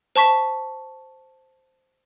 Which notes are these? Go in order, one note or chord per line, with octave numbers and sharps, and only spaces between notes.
C5 A5 C#6 B6